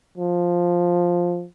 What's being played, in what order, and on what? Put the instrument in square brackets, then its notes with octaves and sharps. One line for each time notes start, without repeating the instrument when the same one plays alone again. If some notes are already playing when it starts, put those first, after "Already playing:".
[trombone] F3